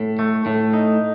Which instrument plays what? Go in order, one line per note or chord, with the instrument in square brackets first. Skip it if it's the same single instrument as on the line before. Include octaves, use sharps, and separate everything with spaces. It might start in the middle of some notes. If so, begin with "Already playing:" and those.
Already playing: [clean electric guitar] A2
A3
A2
D#4